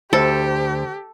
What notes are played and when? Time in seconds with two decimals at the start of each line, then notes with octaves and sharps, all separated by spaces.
0.13 D2 G4 A4 C5